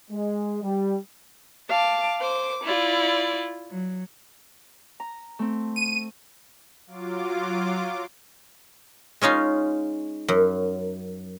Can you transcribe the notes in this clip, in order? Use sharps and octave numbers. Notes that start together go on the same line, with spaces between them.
G#3
G3
F5 A5 D6
C5 D6
E4 F4 D5
F#3
A#5
A3 C4
D#7
F#3 F4 D6
G#3 C#4 D#4 F4
F#2